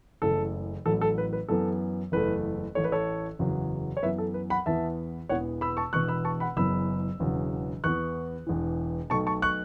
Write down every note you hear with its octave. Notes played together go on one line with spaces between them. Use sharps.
F#1 F#2 C#3 E3 A3 A4
A1 A2 F#3 A4
A4
B4
B4
F#2 E3 B3 A4
F#1 E2 E3 A3 B4
A1 A2 A3 C#5
B4
A4 C#5
F#1 E2 C#3 F#3
C#5
F#2 E3 B3 B4 E5
A4
B4
F#5 B5
E2 E3 B3 E5 A5
E1 E2 E3 B3 C#5 F#5
B5 E6
A5 C#6
E1 E2 B2 C#6 F#6
B5 E6
A5 C#6
F#5 B5
F#1 F#2 C#3 E3 B3 B5 E6
E1 E2 C#3 F#3
E2 E3 B3 C#6 F#6
E1 E2 E3
B1 B2 A3 A5 C#6
A5 C#6
C#6 F#6